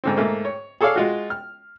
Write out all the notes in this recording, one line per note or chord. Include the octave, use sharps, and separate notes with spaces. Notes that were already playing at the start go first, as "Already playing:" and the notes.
G#2 D3 C4
G#2 A3 A#3
C#5
G#4 A4 C#5 D5 F5
G#3 F4 F#4
F6